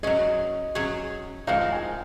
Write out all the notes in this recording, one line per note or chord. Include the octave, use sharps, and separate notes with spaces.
F#3 C#4 G#4 D#5
F#3 C#4 G#4
F3 G#3 D#4 F5
G#5